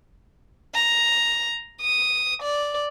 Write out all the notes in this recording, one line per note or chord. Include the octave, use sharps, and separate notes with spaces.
A#5
D#6
D5